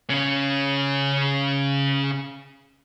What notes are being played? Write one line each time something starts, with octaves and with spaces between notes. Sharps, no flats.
C#3 C#4